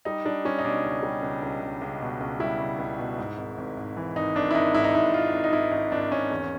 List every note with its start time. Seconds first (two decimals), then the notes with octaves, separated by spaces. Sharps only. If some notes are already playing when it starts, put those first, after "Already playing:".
0.05 G3 D#4
0.25 G3 D4
0.45 G3 C#4
0.59 D#4
0.64 B2 D4
0.84 C#2
1.03 G3
1.22 C#2
1.43 C#2
1.62 C#2
1.81 C#2
2.02 B2
2.20 C#2
2.40 G3 E4
2.60 C#2
2.79 C#2
2.99 B2
3.18 G#2
3.37 G#1
3.58 G#1
3.77 G#1
3.97 E3
4.15 G#1 D#4
4.35 G#1 D4
4.51 E4
4.54 G#1 D#4
4.74 G#2 E4
4.84 D#4
4.94 G#1 E4
5.13 G#1 F4
5.33 G#1
5.44 D#4
5.52 G#1 E4
5.71 G#1 D#4
5.91 G#1 D4
6.12 G#1 C#4
6.31 E2